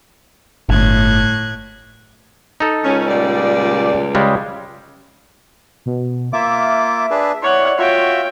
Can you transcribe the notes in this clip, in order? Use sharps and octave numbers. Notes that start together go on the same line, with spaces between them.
G1 A2 F#6 G#6
D#4 A4
C#2 C#4
A#2 G3 D5
C#3 G3 G#3
B2
A#3 F4 E5 D6
D4 G#4 B4
E4 C#5 D5 F#5
F4 F#4 C#5 E5 G5